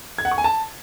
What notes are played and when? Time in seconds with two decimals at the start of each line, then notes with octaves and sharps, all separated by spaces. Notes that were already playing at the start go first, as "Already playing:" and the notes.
0.18 G#6
0.25 F#5
0.31 C#6
0.38 G#5
0.44 A5